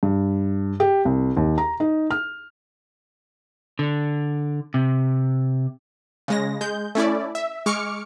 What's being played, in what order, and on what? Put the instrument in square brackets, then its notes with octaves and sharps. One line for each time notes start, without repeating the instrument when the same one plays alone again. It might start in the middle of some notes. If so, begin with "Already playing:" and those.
[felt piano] G2
G4
C2
D#2
A#5
D#4
F6
[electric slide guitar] D3
C3
[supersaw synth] C#3 G#3 A#6
G#3 G6
A3 C#4 E4 D5
E5
G#3 C#6 D6 F6 C#7